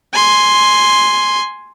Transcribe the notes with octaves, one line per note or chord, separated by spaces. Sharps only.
G#5 C6